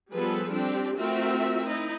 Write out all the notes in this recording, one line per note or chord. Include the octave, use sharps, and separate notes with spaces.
F3 G3 B3 G#4 A4 B4
G3 C4 D4 G4 A4
A3 C4 F4 F#4 A#4 E5
D#4 E4 D#5